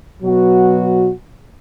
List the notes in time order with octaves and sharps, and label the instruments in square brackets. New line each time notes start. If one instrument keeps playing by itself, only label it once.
[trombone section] B2 F#3 B3 F#4